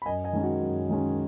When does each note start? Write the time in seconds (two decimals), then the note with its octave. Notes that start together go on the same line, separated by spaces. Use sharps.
0.02 B5
0.06 F#2 D#5 G#5
0.24 D#5 G#5
0.33 D#3 G#3 C#4
0.43 F#4
0.61 F#2
0.89 D#3 G#3 C#4